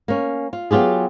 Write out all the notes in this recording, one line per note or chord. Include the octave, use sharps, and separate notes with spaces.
A#3 C#4
F4
F#3 B3 F4 G4 G#4